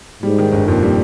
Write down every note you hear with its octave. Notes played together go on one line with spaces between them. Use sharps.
G#2 G3
D#3
G1
F2 A#2
G3